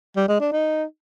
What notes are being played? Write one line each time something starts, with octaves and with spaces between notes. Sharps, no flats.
G3
G#3
D4
D#4